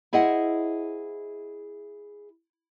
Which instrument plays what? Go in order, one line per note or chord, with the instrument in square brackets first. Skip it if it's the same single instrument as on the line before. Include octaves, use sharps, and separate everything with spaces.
[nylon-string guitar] E4 G#4 C5 D#5 E5 F#5